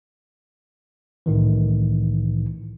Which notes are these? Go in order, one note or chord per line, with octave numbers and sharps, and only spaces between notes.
C2 A2 D#3 E3